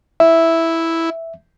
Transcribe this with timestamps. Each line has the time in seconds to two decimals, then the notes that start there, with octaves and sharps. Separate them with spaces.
0.20 E4 E5